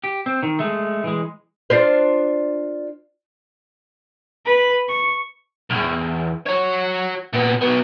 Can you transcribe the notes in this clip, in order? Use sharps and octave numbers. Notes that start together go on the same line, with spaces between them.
G4
C4
D#3
G#3 A3
E3 G#3
D4 F4 C5
B4
C#6
B1 E2
F#4 C#5
A#2 B3
F#3 B3